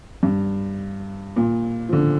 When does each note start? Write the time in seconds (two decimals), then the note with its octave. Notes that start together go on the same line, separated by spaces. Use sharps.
0.23 G2
1.36 A#2
1.89 F3
1.93 D3